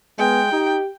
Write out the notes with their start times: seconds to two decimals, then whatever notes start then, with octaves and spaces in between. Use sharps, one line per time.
0.19 G#3 B3 G5
0.52 D#4 G4